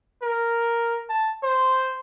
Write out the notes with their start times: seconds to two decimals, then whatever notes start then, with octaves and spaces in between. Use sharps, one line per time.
0.22 A#4
1.09 A5
1.43 C5